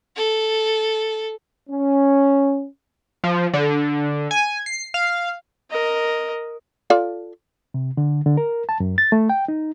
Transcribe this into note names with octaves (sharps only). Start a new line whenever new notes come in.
A4
C#4
F3
D3
G#5
C7
F5
A#4 D#5
F4 A4 D5
C3
D3
D3
A#4
A5
F#2
A6
A3
G5
D#4